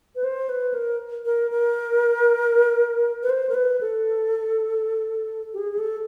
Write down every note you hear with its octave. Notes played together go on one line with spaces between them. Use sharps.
B4
C5
B4
A#4
A#4
A#4
B4
C5
A#4
B4
A4
G4
G#4
G#4
A4